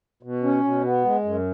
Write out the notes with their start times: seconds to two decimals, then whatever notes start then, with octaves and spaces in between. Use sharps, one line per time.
0.23 B2
0.43 C#4
0.64 B2
0.84 B3
1.05 G#3
1.24 F#2